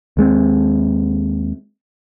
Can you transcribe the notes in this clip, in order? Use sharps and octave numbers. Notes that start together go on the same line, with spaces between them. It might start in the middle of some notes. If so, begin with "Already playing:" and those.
D#2 G#3 B3 C4